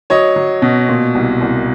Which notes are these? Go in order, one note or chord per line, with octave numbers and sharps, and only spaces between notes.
F#3 C#5 D#5
F#3
B2
A#2
C2
C2